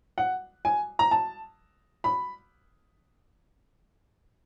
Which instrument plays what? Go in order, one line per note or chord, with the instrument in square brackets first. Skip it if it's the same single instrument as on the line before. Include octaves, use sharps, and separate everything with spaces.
[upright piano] F#5
G#5
A#5
A5
B5